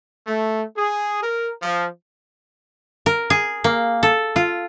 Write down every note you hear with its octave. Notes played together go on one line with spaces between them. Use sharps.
A3
G#4
A#4
F3
A#4
G#4
A#3
A4
F4